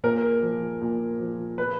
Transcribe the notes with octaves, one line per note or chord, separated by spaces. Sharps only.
A#2 A#4
F3
A#2
F3
B4